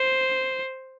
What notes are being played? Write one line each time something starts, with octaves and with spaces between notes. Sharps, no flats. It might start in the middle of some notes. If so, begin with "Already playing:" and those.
Already playing: C5